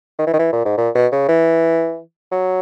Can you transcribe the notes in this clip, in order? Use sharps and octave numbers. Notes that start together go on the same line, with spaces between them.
D#3
E3
D#3
E3
A#2
G#2
A#2
B2
C#3
E3
F#3